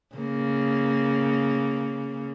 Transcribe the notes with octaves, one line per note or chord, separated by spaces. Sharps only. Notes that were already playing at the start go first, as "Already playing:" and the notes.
C#3 A#3